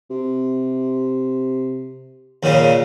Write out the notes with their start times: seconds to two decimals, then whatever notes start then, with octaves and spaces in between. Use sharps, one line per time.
0.10 C3
2.43 D#2 A#2 C#3